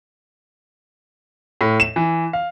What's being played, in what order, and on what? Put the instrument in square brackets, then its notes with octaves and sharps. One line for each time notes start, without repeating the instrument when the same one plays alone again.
[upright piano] A2
E7
E3
F5